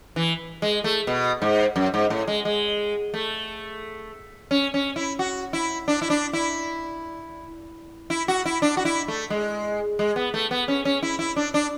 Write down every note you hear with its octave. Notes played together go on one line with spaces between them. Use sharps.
E3
G#3
A3
B2
G#2
F#2
G#2
A2
G#3
G#3
A3
C#4
C#4
E4
F#4
E4
D4
E4
D4
E4
E4
F#4
E4
D4
F#4
E4
A3
G#3
G#3
B3
A3
B3
C#4
C#4
E4
E4
D4
D4